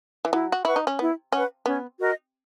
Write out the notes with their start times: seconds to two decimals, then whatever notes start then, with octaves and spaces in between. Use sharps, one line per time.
0.25 E3
0.32 F#3 E4
0.52 F#4
0.65 E4 B4 F#5 C#6
0.76 D#4
0.87 C#4
0.99 B3 E4
1.32 C#4 B4 F#5 C#6
1.66 B3 C#4
1.99 F#4 A#4 D#5